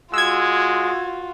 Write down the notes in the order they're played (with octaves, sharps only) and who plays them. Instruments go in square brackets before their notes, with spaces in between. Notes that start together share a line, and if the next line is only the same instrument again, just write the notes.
[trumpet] G#3 [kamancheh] F4 F#4 [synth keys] E6 G#6